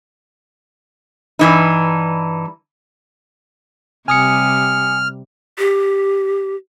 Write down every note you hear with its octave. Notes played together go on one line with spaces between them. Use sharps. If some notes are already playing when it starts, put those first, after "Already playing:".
G2 E3 D#4
C3 G3 G#5 D#6 F6 C#7
G4